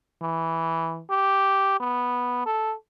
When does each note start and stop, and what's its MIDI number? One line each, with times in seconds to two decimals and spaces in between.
0.22 1.02 52
1.10 1.77 67
1.80 2.43 59
2.46 2.75 69